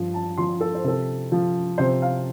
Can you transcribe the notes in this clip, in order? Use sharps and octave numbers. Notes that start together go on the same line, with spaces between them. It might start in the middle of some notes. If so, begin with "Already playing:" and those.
Already playing: G2 F3
A5
F3 C6
A4
C5
C3 A4
F3
C3 C5
F5